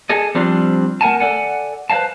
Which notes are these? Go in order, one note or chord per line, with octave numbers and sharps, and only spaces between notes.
G#4 A4 D#5
F3 G3 C4 D4 F4
A3 A#4 F#5 G#5 A5
A4 B4 D5 F#5 G#5
B4 C5 D5 F5 A5